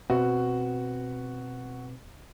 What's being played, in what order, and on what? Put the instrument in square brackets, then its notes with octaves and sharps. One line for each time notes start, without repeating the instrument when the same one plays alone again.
[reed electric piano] B2 C4 B4 [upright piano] F#4